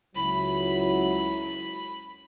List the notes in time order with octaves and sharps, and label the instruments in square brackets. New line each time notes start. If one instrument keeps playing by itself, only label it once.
[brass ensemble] C#2 F#3 E4 [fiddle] B5